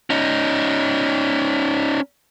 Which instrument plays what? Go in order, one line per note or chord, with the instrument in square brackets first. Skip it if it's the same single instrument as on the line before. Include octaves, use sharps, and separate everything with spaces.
[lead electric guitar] C#4 D#4